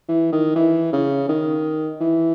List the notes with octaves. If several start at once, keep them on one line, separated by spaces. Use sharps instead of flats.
E3
D#3
E3
C#3
D#3
E3